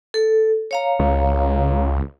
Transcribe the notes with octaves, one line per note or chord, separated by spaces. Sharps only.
A4
C#5 F5 A#5
C#2